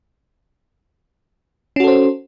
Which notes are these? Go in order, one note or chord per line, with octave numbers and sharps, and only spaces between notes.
C#4 F#4 A4 C5